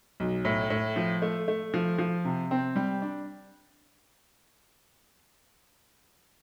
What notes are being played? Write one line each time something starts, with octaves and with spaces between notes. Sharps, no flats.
B1
A2
A2
F3
A3
A3
F3
F3
C3
C4
G3
D4